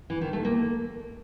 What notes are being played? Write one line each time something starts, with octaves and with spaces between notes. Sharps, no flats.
E3
D#3
A3
A#3